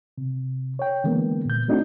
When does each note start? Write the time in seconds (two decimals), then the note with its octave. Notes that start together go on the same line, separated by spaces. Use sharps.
0.18 C3
0.79 C#5 G5
1.04 D3 E3 G#3 A#3 B3
1.45 A#2 G6
1.68 A3 C4 D4 D#4 F#4